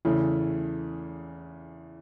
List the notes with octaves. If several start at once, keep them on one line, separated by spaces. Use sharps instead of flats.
E2 C#3 E3 A3